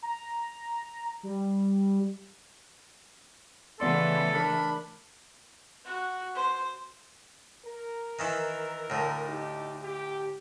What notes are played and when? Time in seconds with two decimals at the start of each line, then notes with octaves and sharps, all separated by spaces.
0.02 A#5
1.23 G3
3.80 C#3 E3 A3 B3 A4 D5 C6
4.34 D4 A#4 B5
5.85 F#4
6.35 C5
7.65 A#4
8.19 D#3 E3 E4
8.90 D2 A2
9.29 D#4 G4
9.82 G4